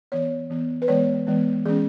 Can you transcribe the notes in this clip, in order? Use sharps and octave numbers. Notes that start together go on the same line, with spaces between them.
E3 B3 C#5
E3 B3
B4
E3 G#3 B3 C#5
E3 G#3 B3
E3 G#3 C#4 G#4